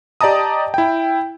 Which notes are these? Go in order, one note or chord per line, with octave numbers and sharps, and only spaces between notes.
G4 D5 D#5 A5 A#5 D#6
E4 G5